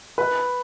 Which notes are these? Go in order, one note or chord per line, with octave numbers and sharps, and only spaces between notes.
B4